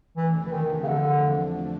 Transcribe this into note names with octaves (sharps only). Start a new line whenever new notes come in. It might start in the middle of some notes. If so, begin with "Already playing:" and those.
E2 C3 E3 F3 A3 D4
E3
D#3
C#3
D3